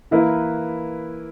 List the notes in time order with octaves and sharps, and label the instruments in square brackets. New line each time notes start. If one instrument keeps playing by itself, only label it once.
[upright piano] E3 A#3 E4 B4